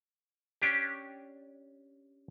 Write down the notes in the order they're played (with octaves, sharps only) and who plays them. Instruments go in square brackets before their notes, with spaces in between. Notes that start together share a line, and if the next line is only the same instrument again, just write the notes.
[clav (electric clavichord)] C#4 D4 G4